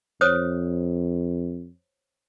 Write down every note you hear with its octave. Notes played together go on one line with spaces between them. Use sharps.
F2 C5 C#5 D#6